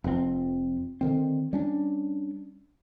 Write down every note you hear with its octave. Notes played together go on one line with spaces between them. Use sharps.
F1 F2 C3 C4
D3 D#3 C4
G3 C#4 D4